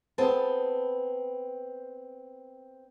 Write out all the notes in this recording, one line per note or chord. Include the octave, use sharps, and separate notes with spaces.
B3 C4 G#4 A5